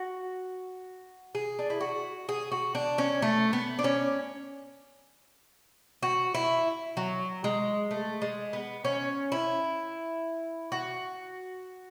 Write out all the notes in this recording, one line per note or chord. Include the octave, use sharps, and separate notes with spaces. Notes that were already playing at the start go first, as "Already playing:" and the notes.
Already playing: F#4
G#4
D4
E4
F#4
G#4
F#4
D4
C#4
A3
B3
D4
C#4
F#4
E4
F#3
G#3
A3
G#3
B3
C#4
E4
F#4